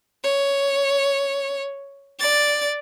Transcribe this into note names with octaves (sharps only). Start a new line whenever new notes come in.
C#5
D5 A6